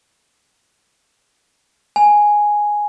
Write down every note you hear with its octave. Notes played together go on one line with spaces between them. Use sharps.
G#5